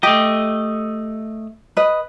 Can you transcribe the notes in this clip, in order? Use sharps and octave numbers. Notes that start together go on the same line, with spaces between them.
A3 G4 D#5
B4 D#5